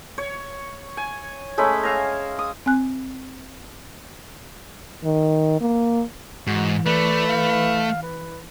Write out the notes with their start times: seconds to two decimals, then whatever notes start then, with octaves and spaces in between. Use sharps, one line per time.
0.18 C#5
0.97 G#5
1.58 G#3 A3 C#4 B5
1.83 E5 F5 G#5 A#5
2.39 D#6
2.66 C4 G#5 F#6
5.04 D#3
5.61 A#3
6.47 G#2 E3 F#4
6.86 A3 B4 D5
7.28 F5
8.03 B4